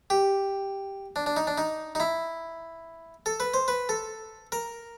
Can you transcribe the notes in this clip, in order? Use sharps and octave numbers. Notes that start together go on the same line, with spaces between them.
G4
D4
D4
D#4
D4
D#4
D#4
E4
A4
B4
C5
B4
A4
A#4